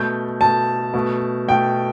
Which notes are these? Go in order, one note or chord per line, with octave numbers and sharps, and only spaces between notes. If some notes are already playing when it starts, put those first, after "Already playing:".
Already playing: B2 A3 G6
B2 A3 A5
B2 A3
B2 A3 G5